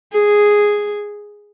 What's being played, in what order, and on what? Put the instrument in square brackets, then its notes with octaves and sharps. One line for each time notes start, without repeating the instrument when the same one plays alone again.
[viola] G#4